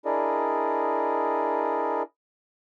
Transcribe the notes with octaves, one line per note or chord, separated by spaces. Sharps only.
D4 E4 G#4 A#4 D5 D#5